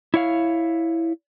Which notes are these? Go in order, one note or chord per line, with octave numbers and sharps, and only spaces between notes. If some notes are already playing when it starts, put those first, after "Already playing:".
E4 C#5 F5